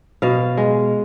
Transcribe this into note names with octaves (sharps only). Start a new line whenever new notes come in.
B2 F5
G#3